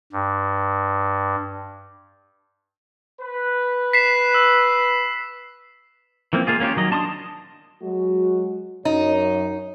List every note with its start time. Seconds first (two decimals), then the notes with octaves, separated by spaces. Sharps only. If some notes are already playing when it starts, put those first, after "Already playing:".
0.12 G2
3.21 B4
3.93 B6 C7 E7
4.34 E6
6.33 E3 F3 A#3 C4
6.47 G#3 A#3 F4 G#4
6.60 A#3 C#4 F4 G4
6.76 D#3 F#3 D#5
6.91 D4 A5 C6 C#6 D#6
7.83 F#3 G#3 F#4
8.85 F#2 D#4 C#5